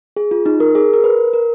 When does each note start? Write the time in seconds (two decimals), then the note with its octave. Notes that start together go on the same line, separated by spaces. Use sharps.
0.16 G#4
0.31 F4
0.46 D#4
0.60 A#4
0.75 G#4
0.94 A#4
1.04 B4
1.33 A#4